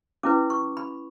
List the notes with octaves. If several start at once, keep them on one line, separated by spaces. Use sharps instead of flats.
C#4 E4 B4 D6
C#6
B5